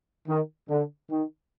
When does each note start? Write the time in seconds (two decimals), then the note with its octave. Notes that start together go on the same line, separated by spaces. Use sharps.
0.28 D#3
0.69 D3
1.10 D#3